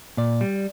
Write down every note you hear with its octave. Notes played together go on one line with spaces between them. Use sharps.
A#2 D5
G3